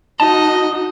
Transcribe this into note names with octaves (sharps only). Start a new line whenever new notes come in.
D#4 F#4 D#5 A5